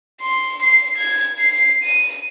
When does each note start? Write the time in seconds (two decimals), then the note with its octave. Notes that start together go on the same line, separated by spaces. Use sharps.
0.21 C6
0.62 C7
0.97 G#6
1.39 C7
1.83 D#7